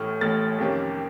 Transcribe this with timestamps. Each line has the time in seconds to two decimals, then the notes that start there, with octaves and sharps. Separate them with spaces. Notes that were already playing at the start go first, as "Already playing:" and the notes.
Already playing: A1 A2 A3 C#6 F6
0.21 A1 A2 A3 F6 A6
0.58 F2 C3 D#3 A#3 C#4